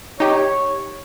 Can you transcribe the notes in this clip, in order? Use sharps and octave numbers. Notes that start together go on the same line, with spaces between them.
D#4 G4 C#5